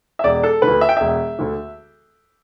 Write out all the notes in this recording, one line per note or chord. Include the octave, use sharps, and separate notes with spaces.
E5
E1 D5
A4
D2 D3 B4
E5
G5
E1 E5
D2 D3